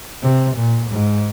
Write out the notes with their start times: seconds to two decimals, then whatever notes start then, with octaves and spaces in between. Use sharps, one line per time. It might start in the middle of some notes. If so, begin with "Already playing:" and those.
0.22 C3
0.57 A#2
0.91 G#2